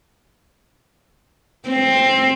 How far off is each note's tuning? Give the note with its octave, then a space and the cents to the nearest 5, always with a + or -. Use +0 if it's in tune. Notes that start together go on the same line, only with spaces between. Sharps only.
C4 +15